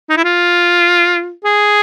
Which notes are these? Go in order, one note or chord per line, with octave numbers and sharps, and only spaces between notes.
D#4
E4
F4
G#4